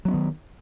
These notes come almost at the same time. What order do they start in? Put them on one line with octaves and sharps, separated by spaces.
F#3 C#4 B3 D#3